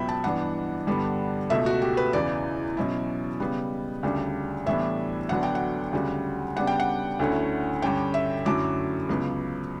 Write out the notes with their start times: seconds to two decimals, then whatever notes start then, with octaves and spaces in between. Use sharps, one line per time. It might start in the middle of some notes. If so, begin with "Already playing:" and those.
Already playing: C#2 B2 F#3 B3 E5 G5 B5
0.09 A5
0.24 G2 E3 B3 D4 F#5
0.87 G2 D3 G3 B3 D4
1.50 C#2 B2 A3 E5
1.66 F#4
1.82 G4
1.97 B4
2.13 E2 C#3 E3 D5
2.77 B2 F#3 C#4 E4
3.40 C#3 G3 B3
4.03 D2 C#3 G3 D4
4.66 A2 E3 G3 B3 D4 E5
5.29 D2 D3 F#3 B3 D4 F#5
5.43 G5
5.55 F#5
5.93 D2 C#3 G3
6.56 C#3 G3 B3 D4 F#5
6.67 G5
6.80 F#5
7.19 D2 D3 A3 C#4 E4
7.82 G2 D3 G3 C#4 G5
8.14 E5
8.45 F#2 D3 F#3 A3 E4 D6
9.09 C#2 C#3 F#3 B3